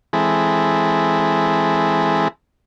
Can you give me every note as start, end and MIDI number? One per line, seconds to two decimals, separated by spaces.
0.13 2.28 52
0.13 2.28 56
0.13 2.28 60
0.13 2.28 64
0.13 2.28 68
0.13 2.28 69